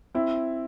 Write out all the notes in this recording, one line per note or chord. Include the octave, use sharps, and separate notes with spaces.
C4 E4